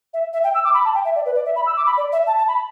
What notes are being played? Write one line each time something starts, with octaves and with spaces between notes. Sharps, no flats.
E5
E5
G5
E6
D6
B5
A5
G5
E5
D5
B4
D5
E5
B5
E6
D6
B5
D5
E5
A5
A5
B5